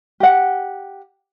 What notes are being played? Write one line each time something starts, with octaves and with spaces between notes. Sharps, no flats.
G4 F#5